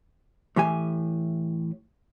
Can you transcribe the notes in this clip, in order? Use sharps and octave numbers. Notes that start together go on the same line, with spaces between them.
A2 E3 G4 G#5